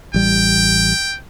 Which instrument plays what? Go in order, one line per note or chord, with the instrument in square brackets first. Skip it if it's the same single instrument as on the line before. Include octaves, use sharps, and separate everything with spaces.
[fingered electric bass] A1 G3 [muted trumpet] G5